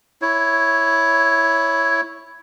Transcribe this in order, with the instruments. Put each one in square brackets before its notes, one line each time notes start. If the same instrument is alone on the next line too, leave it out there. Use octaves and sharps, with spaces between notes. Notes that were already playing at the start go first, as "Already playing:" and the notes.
[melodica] E4 C#5